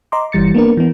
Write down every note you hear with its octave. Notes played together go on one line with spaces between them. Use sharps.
D#5 A#5 C6 D6
G1 E3 G3 A6 C#7
A#3 B3 D4 A#4
E3 B3